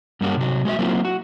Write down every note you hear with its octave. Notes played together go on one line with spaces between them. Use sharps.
G2 G3 G#3 A#3 C#4 F#4
C3 F#3
G#3 F#4 C5 E5
F#3 A#3 C4 E4 F4
F#4